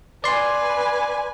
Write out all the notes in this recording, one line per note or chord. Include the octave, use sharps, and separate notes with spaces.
B4 D5 G#5 C6